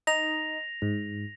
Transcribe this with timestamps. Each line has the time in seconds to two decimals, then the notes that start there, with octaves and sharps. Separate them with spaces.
0.07 D#4 A#6 F7
0.82 G#2